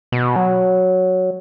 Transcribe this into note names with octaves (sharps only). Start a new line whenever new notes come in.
B2
F#3